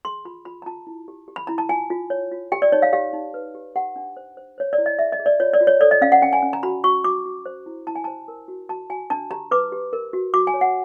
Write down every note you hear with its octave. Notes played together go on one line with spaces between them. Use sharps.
G#4 C6
F4 B5
F4 B5
A#5
F4 A5
E4
G4
G4
B5
E4 A#5
A5
F4 G#5
F4
C#5
F4
G4 G5
D5
D#4 C#5
F5
G4 F5
D#4
B4
G4
G4 F#5
D4
C5
C5
C5 C#5
D5
E4
D#5
G#4 E5
D#5
G#4
D5
F4 C#5
D5
F4
C#5
A4 D5
D#5
C#4 F5
F#5
C#4 G5
G#5
C#4
A#5
F#4 B5
F#4 C#6
F#4 D6
F#4
C5
E4
E4 A5
G#5
C5 A5
A#4
F#4
F#4 A5
F#4 G#5
D4 A5
G4 A#5
B4 D6
G4
A#4
F#4
F#4 D6
G#5
C#5
F#5